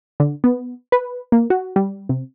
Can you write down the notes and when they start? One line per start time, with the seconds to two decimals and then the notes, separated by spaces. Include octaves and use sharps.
0.20 D3
0.44 B3
0.92 B4
1.32 A#3
1.50 F#4
1.76 G3
2.09 C3